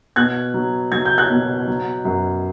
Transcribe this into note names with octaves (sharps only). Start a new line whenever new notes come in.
B2 F#6 G#6
F#3
F#3 G#6
G6
F#6 G#6
B2
F#3
F#2